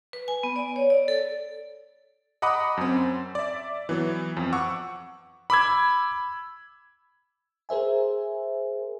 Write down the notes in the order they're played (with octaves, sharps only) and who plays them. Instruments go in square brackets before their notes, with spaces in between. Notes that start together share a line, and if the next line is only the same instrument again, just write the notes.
[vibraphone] B4
G#5
B3
D5
C#5
D5
A4
[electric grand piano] D#5 F#5 A#5 B5 D6 D#6
F#2 C4
D5 E5
E3 F#3 B3
F2
F#5 C#6 D6 E6
B5 D6 E6 G#6
[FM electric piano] G#4 A#4 C5 E5 G#5